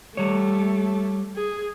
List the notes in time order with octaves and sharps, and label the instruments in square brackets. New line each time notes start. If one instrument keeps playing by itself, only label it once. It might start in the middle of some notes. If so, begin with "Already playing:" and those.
[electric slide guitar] G3 C#5 [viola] A3
[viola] G#4